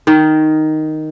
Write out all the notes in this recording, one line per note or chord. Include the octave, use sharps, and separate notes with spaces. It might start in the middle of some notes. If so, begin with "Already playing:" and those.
D#3